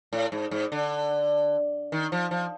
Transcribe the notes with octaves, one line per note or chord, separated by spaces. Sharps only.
A2
G#2
G#2
D3
D#3
F3
F3